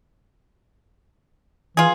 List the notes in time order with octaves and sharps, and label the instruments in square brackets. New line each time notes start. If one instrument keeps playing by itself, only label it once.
[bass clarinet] E3 [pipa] F4 G#4